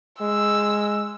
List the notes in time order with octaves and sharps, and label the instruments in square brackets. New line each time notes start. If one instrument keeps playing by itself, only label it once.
[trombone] G#3 [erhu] E6